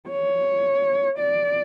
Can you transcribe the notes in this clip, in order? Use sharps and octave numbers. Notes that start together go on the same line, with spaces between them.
C#5
D5